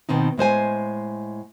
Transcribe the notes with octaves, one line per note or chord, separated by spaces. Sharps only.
B2 D#3 C4 D#4
A2 G#3 C5 G#5